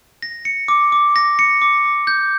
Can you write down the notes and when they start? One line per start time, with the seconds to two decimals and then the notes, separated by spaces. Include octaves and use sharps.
0.22 A#6
0.45 C#7
0.68 D6
0.92 D6
1.16 A#6
1.39 C#7
1.62 D6
1.85 D6
2.07 G6